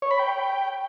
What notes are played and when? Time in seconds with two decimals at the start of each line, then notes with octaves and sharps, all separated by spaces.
0.02 C#5
0.11 B5
0.19 G5